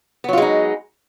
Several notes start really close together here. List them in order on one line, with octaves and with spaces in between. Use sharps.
B3 F#3 F4 G#3 D#4